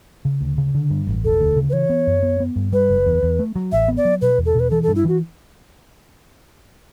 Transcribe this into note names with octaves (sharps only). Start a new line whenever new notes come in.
C#3
D2
C#3
D3
G2
A1
E1 A4
D2
C#3
B4
E3 C#5
B3
F#2
B3
B3
G2
G3 B4
F#1
E2
E2
A3
F#3
A1 E5
B3
D5
F#3
B2 B4
E2
A4
B2 B4
E3 A4
A4
G2
E4
E3 F#4